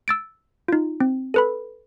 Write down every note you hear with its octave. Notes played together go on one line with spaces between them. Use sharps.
E6 A6 D7
D#4 F4
C4
A4 B4 B5